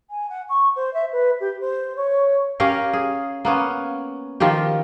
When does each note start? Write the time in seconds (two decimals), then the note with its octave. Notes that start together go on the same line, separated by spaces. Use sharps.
0.10 G#5
0.29 F#5
0.49 C#6
0.76 C5
0.94 E5
1.12 B4
1.40 G4
1.60 C5
1.96 C#5
2.60 C#4 G4 A#4 F5
2.93 G#4
3.45 A#3 B3 C#4
4.40 D#3 F3 F4 G4